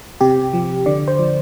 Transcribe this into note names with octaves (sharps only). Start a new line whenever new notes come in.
C3 G4
F3
D3 D5
C5
F3